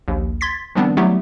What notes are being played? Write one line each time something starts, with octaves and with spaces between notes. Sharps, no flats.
A#1 D#2
C6 G#6 A6 B6
D#3 F3 G3 B3 C4 D4
F#3 G3 A3 B3 E4 G4